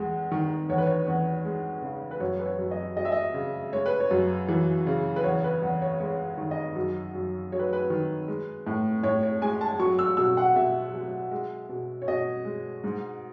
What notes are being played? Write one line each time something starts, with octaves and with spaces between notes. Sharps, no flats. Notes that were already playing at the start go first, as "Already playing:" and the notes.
Already playing: E2 G#3
D#3
E2 C#5
B4
C#5
E2
G#3
C#3
B4
F#2 C#5
B4
C#5
F#2
D#5
F#3 D#5
E5
D#5
C#3
G#3 C#5
B4
C#5
F#2
E3
C#3
B4
E2 C#5
B4
E2
C#5
G#3 C#5
D#3
D#5
F#2
F#2
F#3 C#5
B4
B4
D#3
G#3
A2
A2 C#5
C#5
G#3 G#5
A5
F#3 C#6
E6
B2 E6
F#5
B2 E5
F#3
G#3
B2
C#5
B2 D#5
G#3
G#2